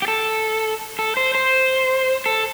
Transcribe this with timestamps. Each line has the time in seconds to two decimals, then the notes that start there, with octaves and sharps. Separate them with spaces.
0.02 G4
0.08 A4
0.99 A4
1.17 C5
1.35 C5
2.26 A4